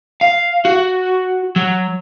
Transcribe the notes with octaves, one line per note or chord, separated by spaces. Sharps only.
F5
F#4
F#3